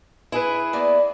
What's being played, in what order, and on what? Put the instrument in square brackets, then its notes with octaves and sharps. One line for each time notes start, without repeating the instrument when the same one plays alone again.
[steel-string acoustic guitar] E4 G#4 B4
[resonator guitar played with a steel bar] A#3 B3 D5